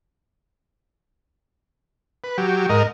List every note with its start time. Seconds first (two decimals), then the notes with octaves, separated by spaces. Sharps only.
2.24 B4
2.38 F#3 G4
2.69 G#2 A#4 D#5